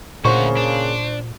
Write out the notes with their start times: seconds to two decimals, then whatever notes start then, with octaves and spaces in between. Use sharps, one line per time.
0.25 D2 A#2 C#3 A#3 F#4 C5 C#6
0.57 D4